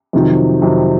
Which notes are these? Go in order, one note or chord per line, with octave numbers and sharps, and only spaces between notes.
F2 C3 D#3 F#3
F2 C3 D#3 F#3